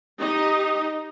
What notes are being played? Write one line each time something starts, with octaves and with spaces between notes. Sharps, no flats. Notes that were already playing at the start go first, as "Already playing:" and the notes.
D#4 G4 D#5